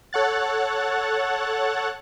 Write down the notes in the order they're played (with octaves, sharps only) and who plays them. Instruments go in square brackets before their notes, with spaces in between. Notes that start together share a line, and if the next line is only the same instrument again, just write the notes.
[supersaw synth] A4 C#5 F#5 F#6 A6